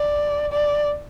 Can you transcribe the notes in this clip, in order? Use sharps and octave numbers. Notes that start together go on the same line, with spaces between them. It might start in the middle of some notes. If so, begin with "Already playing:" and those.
Already playing: D5
D5